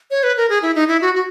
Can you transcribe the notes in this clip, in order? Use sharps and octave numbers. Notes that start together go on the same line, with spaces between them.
C#5
B4
A#4
G#4
E4
D#4
E4
F#4
F#4